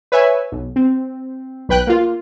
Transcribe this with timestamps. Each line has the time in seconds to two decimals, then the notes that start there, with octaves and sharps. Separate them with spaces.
0.12 B4 C#5 E5 G#5
0.52 B1
0.76 C4
1.69 B1 B4 G5 F#6
1.87 A#3 F4